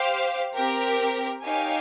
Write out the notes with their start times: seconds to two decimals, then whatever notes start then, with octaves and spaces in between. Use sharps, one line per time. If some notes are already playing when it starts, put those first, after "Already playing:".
Already playing: G4 C5 F5
0.55 C4 G4 A#4
1.43 D#4 G4 C#5 F5 G#5